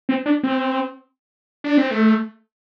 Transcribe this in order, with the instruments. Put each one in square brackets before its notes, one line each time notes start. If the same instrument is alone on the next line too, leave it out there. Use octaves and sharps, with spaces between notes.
[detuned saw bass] C4
D4
C4
D4
C4
A3